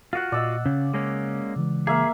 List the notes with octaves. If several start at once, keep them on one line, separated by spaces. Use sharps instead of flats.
F4 F#4 F5 F#5
A#2 D5 D#5 E6
C#3 C#4
C#3 G#3 A#3 C#4
C#3 E3 G#3
A#3 G#4 E5 F5